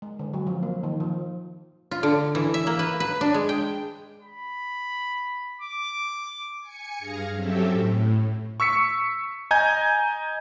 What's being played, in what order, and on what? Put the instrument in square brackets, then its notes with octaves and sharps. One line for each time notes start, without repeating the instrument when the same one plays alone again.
[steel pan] G#3
D3
F#3
F3
A#3
D#3
F3
[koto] F4
D3
E3
E5
A#3
B4
B4
D4
G#3
G5
[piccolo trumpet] B5
D6
[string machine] G#5 C#7
G2 G#4 F5 A#6
F#3 C4 C#4 G4 A4 E5
A2
[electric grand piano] C#6 E6 B6 C#7
D#5 G#5 A#5 G6 G#6